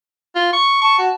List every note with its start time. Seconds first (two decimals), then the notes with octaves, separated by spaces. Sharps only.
0.36 F4
0.53 C#6
0.82 A5 C#6
0.99 F#4